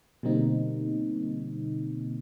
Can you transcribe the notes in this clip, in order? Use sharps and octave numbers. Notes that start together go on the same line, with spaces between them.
B2 D3 G3 A#3 C4 D#4